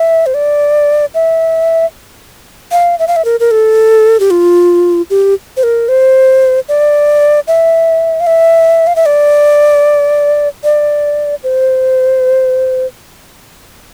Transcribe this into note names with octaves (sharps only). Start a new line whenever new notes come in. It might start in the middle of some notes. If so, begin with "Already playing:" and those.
Already playing: E5
C5
D5
E5
F5
E5
F5
E5
A#4
A#4
A4
G4
F4
G4
C5
A#4
C5
D5
E5
F5
E5
F5
E5
D5
D5
C5